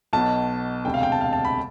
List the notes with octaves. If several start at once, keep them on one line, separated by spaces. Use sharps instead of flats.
B1 B2 A5
E1 D2 C3 G5
F5
G5
A5
F5
A5
B5